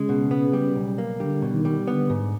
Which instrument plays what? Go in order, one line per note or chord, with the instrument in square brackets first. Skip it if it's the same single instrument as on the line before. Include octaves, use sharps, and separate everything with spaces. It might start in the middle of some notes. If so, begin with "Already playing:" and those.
Already playing: [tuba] C#3 [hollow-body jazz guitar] G#3
[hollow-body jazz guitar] B2
B3
G3
B1
A#3
[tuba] D3 [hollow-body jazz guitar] G3
[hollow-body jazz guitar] B2
[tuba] D#3
[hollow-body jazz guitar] G3
[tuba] D3 [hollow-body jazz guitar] B3
[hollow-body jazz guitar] G#2